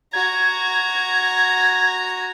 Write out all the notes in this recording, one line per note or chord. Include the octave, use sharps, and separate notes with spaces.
F#4 A#5 G#6